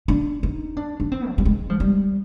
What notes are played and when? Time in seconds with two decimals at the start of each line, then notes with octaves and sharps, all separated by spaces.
0.08 D4
0.43 D#4
0.77 D4
1.00 D4
1.12 C4
1.29 F3
1.38 G3
1.45 G#3
1.70 F3
1.80 G3